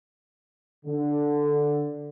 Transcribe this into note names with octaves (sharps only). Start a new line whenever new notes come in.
D3